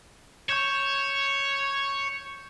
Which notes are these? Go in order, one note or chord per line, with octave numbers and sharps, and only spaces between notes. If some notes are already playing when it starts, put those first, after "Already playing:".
C#5 C#6 G6 E7